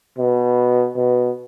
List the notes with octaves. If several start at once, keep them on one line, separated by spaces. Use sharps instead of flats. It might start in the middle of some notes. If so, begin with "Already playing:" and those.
B2
B2